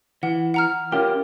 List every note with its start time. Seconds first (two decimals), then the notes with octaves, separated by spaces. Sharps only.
0.23 E3 F#5
0.54 F#5 A#5 F6
0.92 C#4 F4 G4 A#4